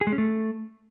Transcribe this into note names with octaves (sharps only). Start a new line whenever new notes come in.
G#4
G#3
C#4
A3